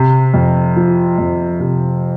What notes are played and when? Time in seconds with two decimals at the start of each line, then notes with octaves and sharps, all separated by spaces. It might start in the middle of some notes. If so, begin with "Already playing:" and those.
Already playing: C3
0.34 F2
0.76 F3
1.18 F2
1.60 C3